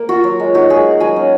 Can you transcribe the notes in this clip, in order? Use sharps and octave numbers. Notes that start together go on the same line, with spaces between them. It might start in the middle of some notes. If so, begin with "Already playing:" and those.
Already playing: A#3
F4 F#4
F#3
G#3
D#4 F#4
G#3 G#4
D#4
F#3 G#5
C#4